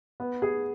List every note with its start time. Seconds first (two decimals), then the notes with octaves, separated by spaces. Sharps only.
0.20 B3
0.42 G#4